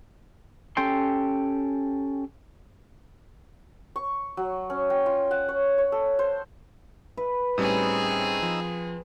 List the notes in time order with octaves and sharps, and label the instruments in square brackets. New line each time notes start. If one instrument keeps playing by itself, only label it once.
[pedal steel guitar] C#4 G4 A4 G5 C6
[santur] C#6
F#3
C#4
G5
F4
F#5
C#5
C#5
A4
C5
[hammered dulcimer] B4
[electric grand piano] A2 G3 C#4 [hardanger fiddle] C4 G#4 [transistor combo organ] D#4 D#6 E6
[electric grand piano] F3